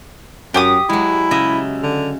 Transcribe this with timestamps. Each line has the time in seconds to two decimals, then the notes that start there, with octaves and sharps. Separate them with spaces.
0.54 F#2 G4 D6 D#6
0.90 F#3 G#3 E4
1.31 C#3 D#5 E5
1.83 D3